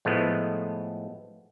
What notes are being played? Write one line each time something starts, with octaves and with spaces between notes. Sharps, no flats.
A2 F3 G#3 A3 B3